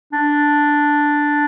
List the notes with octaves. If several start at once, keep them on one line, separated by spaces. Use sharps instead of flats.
D4